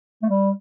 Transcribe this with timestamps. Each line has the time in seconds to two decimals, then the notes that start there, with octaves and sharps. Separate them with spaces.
0.22 A3
0.30 G3